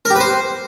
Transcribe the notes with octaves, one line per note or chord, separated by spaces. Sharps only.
A#4
G4
B4
C5